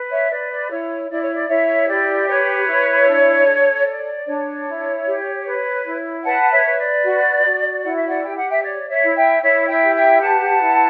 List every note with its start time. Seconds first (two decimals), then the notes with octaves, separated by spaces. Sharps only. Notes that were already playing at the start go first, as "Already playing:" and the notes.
Already playing: B4
0.10 C#5 E5
0.30 B4 D5
0.50 D5
0.69 E4 C#5
1.09 E4 D5
1.21 C#5
1.33 D5
1.48 E4 C#5 E5
1.88 G4 D5
2.27 B4 C#5
2.67 E4
3.07 D4
3.47 A4
3.86 C#5 D5
4.26 D4 C#5
4.66 E4
5.06 G4
5.46 B4
5.84 E4
6.24 B4 F#5 A5
6.51 C#5 E5
6.64 B4
6.78 D5
7.04 F#4
7.44 F#4
7.83 E4 F#5
7.95 E5
8.07 D5 F#5
8.23 G4 G5
8.37 F#5
8.50 E5 G5
8.63 C#5 D5
8.89 C#5 E5
9.02 E4
9.15 E5 G5
9.41 E4 C#5 E5
9.68 E5 G5
9.81 G4
9.95 E5 G5
10.21 B4 F#5 A5
10.60 E4